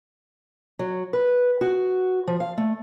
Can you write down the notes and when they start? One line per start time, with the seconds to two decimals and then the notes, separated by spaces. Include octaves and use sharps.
0.79 F#3
1.13 B4
1.61 F#4
2.27 F3
2.40 F5
2.58 A3